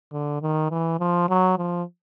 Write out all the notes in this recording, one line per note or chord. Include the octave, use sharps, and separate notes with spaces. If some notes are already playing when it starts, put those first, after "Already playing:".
D3
D#3
E3
F3
F#3
F3